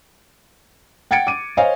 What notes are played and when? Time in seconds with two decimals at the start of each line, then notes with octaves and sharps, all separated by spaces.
1.11 F#5 G5 G#6 A6 C#7 D7
1.27 D6 D#7
1.57 C5 C#5 D#5 F5 G#5